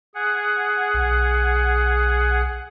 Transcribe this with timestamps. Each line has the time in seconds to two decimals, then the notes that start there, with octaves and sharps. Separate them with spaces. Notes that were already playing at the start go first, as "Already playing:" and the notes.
0.15 G#4 F#5
0.94 B1